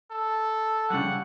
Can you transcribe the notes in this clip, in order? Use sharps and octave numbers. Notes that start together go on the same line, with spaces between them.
A4
C#3 G3 F#5